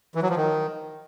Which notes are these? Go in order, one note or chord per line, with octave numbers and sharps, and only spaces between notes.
E3
F#3
F3
D#3